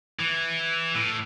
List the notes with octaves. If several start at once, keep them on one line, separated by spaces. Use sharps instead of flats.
E3
A2